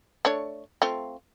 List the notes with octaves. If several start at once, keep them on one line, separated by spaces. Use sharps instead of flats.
A3 D4 C#5
A3 C4 F4